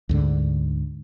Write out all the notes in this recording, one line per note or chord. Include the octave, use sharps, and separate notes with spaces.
D2 G#2 D3